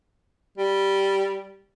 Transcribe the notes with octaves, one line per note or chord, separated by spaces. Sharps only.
G3